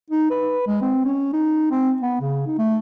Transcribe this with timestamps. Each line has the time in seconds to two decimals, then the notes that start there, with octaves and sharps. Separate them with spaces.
0.10 D#4
0.30 B4
0.67 G#3
0.81 C4
1.05 C#4
1.33 D#4
1.71 C4
2.02 B3
2.21 C#3
2.46 D#4
2.58 A3